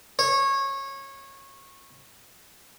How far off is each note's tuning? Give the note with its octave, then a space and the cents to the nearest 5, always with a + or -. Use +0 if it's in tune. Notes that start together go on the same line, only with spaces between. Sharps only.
C#5 -20